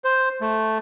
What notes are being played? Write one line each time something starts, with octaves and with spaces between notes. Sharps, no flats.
C5
A3